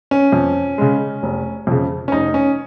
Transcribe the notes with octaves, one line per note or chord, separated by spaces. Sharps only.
C#4
F2
C#3 G#3
F1
F2 C#3
C#4
F1 D#4
C#4